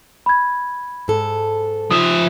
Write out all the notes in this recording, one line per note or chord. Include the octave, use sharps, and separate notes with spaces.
B5 G#6
G#2 A4
F3 E5 D#6